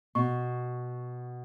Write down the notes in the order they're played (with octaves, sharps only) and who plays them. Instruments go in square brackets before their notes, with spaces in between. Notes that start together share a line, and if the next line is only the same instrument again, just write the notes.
[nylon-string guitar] B2 [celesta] C#6